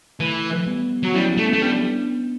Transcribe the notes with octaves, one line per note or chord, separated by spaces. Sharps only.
E3 A3
G3 B3
F#3
G3 C#4 E4
A3
A3
G3 B3 D4